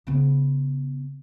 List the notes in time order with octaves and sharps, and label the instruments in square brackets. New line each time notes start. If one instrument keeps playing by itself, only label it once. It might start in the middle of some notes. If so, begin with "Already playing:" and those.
[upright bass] C#3 B3